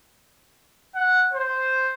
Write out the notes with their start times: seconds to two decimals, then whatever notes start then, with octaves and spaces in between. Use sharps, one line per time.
0.95 F#5
1.33 C5